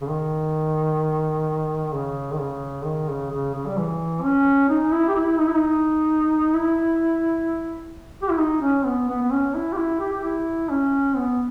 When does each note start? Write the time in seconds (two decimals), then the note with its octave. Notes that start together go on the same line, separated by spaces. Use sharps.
0.01 C#3
0.08 D#3
1.93 C#3
2.33 D#3
2.39 C#3
2.85 D#3
3.09 C#3
3.31 C#3
3.55 C#3
3.66 G3
3.78 E3
4.23 C#4
4.69 D#4
4.93 E4
5.08 G4
5.16 E4
5.39 D#4
5.47 E4
5.56 D#4
6.54 E4
8.22 G4
8.30 E4
8.39 D#4
8.61 C#4
8.86 B3
9.09 B3
9.22 B3
9.31 C#4
9.54 E4
9.73 G4
9.77 E4
10.00 G4
10.13 G4
10.23 E4
10.70 C#4
11.17 B3